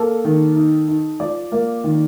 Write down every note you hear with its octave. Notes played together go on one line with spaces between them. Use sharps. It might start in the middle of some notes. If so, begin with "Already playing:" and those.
Already playing: A#3 A4
D#3
D#4
D#4
F3 D5
A#3
D#3